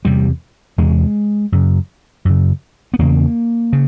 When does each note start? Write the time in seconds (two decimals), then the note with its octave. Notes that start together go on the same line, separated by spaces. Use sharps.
0.05 E2 C3 G3
0.78 E2 C3 G#3
1.52 F#2 C#3
2.25 F#2 C#3
2.94 B3
2.99 E2 C#3 A#3
3.73 C#3